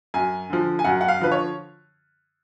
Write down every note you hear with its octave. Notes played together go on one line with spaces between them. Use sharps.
F#2 G#5
D3 F3
G#5
F#2 F#5
F#5
F5
D3 F3 B4
C#5